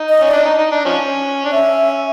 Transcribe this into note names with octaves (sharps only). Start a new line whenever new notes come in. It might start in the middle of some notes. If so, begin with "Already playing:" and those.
Already playing: D#4
D#5
C#4
D5
D4
D#4
D#4
D4
F3 C#4
D4
C#4 E5